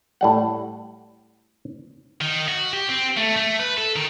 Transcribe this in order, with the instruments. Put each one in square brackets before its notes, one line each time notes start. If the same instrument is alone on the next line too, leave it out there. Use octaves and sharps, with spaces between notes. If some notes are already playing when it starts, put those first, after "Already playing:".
[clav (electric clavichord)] A2 G3 F#5
[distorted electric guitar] D#3
F#4
G4
C4
A3
A3
B4
A4
D#3